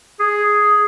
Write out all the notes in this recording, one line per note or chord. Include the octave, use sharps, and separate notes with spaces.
G#4